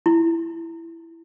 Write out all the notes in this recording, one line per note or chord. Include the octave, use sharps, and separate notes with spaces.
E4